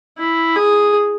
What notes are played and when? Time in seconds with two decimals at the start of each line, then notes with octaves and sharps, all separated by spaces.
0.18 E4
0.56 G#4